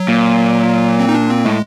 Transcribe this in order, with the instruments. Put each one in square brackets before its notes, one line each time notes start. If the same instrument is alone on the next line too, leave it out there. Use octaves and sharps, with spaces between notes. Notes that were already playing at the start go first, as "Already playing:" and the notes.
Already playing: [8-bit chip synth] F#3
[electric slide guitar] A#2
[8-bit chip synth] C4
D#4
D4
C4
[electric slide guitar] A2 [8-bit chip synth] G#3